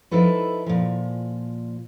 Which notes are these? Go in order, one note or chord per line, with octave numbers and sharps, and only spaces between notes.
F3 D#4 E4 A4 B4
A#2 F3